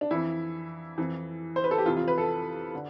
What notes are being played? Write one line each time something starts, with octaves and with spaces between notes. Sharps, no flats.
D4
F2 E3 E4
F2 E3
C5
B4
A4
G4
F2 C3 E3 F4
F4
B4
A4
D3